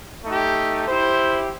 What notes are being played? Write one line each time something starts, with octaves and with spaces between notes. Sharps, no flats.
A3 D#4 G4
E4 G4 C5